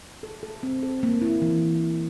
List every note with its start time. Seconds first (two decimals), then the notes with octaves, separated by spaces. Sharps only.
0.23 A4
0.43 A4
0.63 C4
0.83 A4
1.03 A#3
1.22 E4
1.42 E3